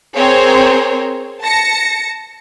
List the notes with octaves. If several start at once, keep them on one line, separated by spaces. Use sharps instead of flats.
C4 G#4 A#4 C5 C#5
A5 A#6 C#7